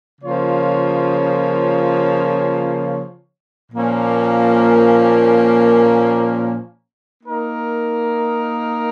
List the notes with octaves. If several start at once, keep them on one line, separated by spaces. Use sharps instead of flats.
C#3 F3 A#3 F4 C#5
A#2 F3 A#3 C#4
A#3 D#4 A#4